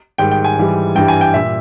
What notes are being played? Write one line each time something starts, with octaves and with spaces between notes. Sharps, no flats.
G#2 D#3 G3 G5
G5
G#5
G#2 E3 G3
G2 E3 G3 G5
G#5
G5
A#2 G3 E5